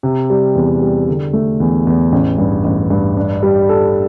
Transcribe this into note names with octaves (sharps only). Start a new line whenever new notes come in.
C3
G3
E2
G3
D3
A3
E2
E2
A1
G2
A1
G2
D4
G3
A4